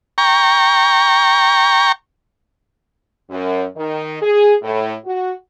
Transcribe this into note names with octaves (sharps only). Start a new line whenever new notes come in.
G5 A#5 C#6
F#2
D#3
G#4
A2
F#4